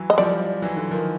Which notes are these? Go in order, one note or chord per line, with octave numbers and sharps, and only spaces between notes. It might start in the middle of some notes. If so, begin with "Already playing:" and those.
Already playing: E3 F#3
D#5
F3 G3 D5
E3 F#3
D3 E3
D#3 F3